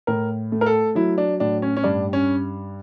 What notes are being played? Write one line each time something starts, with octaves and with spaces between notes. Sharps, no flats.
A2 A#4
A3
A#4
A4
F#3 E4
D4
A2 D4
C#4
C#4
G2 D4
C#4